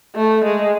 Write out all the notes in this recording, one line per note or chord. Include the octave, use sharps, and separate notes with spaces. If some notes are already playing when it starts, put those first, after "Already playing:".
A3
G#3